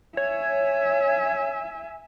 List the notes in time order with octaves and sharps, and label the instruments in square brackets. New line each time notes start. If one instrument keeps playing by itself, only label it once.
[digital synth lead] C#5 [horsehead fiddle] E5 G#5